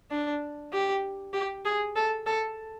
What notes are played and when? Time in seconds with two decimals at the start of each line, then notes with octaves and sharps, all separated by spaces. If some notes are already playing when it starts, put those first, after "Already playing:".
0.11 D4
0.73 G4
1.34 G4
1.65 G#4
1.96 A4
2.26 A4